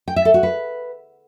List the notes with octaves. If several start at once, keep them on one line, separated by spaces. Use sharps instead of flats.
G5
E5
A4
F#4
B4